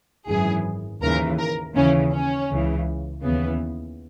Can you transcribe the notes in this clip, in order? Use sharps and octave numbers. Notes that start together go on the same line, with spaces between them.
G#1 F#2 E3 G#4
D#2 C#3 E3 A#4
A#4
D#2 C#3 E3 C#4
C#4
C#2 C#3 E3
D#2 C#3 E3 B3